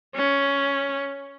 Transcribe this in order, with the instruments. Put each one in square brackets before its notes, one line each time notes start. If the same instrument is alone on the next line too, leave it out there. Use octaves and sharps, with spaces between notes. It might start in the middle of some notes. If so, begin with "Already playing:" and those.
[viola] C#4